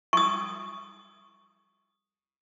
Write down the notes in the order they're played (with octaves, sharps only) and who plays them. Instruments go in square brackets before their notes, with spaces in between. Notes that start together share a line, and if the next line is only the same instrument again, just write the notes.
[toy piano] C#6 D#6